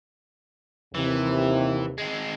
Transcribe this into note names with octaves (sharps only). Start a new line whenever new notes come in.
D#2 C3 E3
G#3 C4